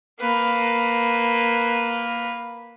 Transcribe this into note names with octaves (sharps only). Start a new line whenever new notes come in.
A#3 B4